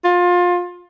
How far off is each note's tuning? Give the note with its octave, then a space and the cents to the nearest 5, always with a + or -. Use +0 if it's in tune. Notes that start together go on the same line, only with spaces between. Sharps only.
F4 +25